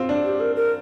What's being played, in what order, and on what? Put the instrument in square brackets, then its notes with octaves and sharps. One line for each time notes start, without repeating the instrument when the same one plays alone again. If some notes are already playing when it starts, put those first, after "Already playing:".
Already playing: [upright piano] C4 F4
D4
[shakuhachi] G4
A#4
A#4